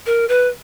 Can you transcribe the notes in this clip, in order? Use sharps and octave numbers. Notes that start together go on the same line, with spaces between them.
A#4
B4